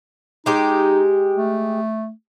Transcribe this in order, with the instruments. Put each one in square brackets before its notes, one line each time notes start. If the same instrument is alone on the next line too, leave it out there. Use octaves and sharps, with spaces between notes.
[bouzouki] G#3 G4 [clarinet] D#4
[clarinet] A3